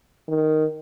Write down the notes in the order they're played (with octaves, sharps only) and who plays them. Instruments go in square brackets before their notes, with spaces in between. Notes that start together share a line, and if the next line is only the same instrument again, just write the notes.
[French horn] D#3